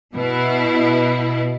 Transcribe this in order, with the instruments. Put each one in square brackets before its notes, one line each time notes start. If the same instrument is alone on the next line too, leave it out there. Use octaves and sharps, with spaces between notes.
[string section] B2 E4